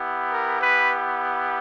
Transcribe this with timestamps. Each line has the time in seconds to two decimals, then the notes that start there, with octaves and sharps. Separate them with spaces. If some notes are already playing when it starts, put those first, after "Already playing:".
Already playing: B3 E4 G4
0.30 A#4
0.60 B4